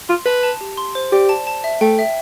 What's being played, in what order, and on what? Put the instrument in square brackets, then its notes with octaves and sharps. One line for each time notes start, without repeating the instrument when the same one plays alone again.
[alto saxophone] F4 [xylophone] C6
[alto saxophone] B4 [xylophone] A5
[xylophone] A5
G4
C6
C5
[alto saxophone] G4 [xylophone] D5
[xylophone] A5
A5
E5
[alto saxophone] A3 [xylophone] G5
[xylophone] E5